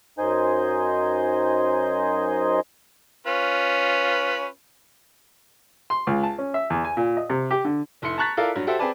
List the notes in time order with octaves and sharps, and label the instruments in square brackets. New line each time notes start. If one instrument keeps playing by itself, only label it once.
[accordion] F#2 D#4 C5 D#5 G#5 G6
[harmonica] C#4 F4 B4
[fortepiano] C6
C#2
A5
C#4
E5
E2
G#5
A#2
D#5
C3
G4
D3
[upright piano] F1 E4 C6 C#7
A5 A#5 C#6 F#6 A6 B6
E4 F4 A4 A#4 D5 F5
G2 F#3
F#4 G4 A4 C5 E5
C4 G#4 B4 D5 A5